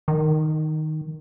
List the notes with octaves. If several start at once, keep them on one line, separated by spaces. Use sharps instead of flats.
D#3